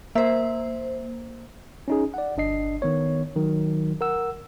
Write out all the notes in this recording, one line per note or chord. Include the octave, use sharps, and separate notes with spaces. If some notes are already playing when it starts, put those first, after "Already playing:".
A#3 C5 E5
C#4 D#4 G#4
D5 F#5
G1 D4 D#5 C7
D#3 B3 C#5
D#3 F#3
A#4 F#5 E6